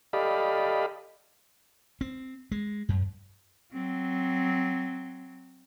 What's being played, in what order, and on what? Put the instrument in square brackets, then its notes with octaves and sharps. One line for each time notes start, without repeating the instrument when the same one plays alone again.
[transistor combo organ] G4 A4 D5 D#5 F5 B5
[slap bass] C4
G#3
F#2
[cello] F#3 C4